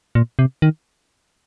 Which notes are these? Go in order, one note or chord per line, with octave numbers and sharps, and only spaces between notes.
A#2
C3
D#3